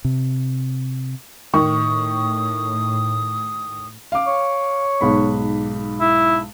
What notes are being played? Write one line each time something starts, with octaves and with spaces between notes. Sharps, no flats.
C3
A2 D#3 C#6 D#6
F5 D6
C#5
B1 G#2 B5
E4